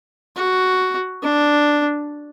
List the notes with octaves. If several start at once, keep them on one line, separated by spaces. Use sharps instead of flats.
F#4
D4